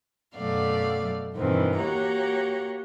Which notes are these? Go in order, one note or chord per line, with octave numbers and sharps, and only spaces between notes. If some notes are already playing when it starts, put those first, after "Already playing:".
F#2 B2 F#3 A3 D5 F5
E2 G2 B2 D#3 E3 C4
A#3 F#4 G4 C#5 A#5